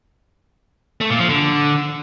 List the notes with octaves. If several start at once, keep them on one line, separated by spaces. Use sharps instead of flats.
A3
A#2
F3
D3